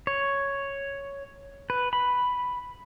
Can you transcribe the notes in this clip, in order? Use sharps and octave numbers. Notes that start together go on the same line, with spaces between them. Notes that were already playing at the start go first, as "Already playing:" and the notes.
C#5
B4
B5